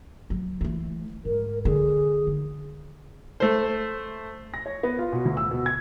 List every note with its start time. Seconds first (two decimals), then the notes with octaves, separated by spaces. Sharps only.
0.30 F#3
0.61 E3 A3
1.25 G#2 A#4
1.65 D3 G#4
2.27 D#3
3.40 A3 C5
4.54 A#6
4.66 C#5
4.83 B3
4.99 F4
5.13 B2
5.25 D2
5.37 E6
5.51 B2
5.66 G#6